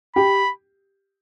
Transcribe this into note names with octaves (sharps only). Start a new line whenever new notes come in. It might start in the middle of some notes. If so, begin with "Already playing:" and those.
G4 B5